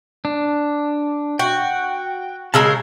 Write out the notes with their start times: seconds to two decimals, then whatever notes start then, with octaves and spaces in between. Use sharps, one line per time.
0.25 D4
1.39 F#4 G5
2.54 C#3 G#3 A#4 A5 E6